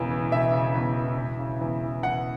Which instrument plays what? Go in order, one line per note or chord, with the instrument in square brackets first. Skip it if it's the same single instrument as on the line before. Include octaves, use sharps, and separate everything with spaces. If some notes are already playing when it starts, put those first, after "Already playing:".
Already playing: [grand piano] E1 E2 C#3
E3
E1 E5
C#3
E2
E3
E1
C#3
E2
E3
E1 F#5